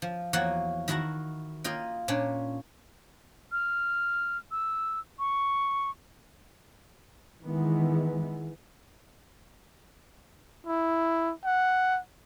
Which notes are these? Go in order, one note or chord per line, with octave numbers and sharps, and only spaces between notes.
F3
E2 F3 A#3 F#4 C#5 F#5
D#3 E4 F#4 A5 A#5
A#3 F4 D#5 G5
A#2 C#4 D4 C#5
F6
E6
C#6
D#3 E3 G#3 B3
E4
F#5